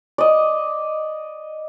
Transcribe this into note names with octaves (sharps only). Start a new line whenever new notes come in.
D5 D#5